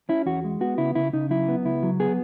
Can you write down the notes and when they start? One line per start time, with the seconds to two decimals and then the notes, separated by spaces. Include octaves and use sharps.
0.09 C#4 E4
0.26 E2 F#4
0.44 G#3
0.61 B3 F#4
0.78 C#3 E4
0.95 C#3 E4
1.13 C#3 D#4
1.30 F#3 E4
1.48 B3
1.65 C#2 E4
1.83 F#3
2.00 B3 G#4